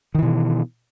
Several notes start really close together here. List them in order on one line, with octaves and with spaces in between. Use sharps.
D#3 E3 B2